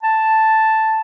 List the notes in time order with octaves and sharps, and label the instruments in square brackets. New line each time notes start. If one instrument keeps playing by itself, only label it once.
[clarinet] A5